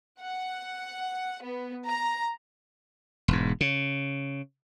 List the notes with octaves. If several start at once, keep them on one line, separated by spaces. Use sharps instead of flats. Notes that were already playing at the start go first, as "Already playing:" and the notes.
F#5
B3
A#5
E1 G#2
C#3